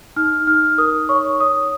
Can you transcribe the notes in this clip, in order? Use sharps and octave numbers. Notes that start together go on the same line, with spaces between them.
D#4 F6
D#4 F6
A#4 D#6
C#5 C#6
C#5 D#6